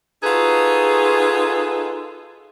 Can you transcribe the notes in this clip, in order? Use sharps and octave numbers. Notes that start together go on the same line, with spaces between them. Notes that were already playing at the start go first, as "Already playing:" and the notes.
D#4 F4 F#4 G#4 A4 B4